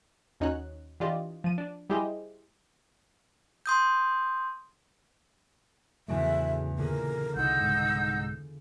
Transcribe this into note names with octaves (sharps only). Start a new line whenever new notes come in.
D#2 C#4 D#4 F#4 C#5 F#6
E3 D4 F4 G4 D5 D#5
F3 D#7
D4
G3 E4 G4 G#4 C5 D#5
C6 D#6 G6
E2 A2 C#3 F#3 A3 D4 E5
A#2 D3 G#4 A#4
C2 D#4 F4 F#5 E6 G6
C2 G#2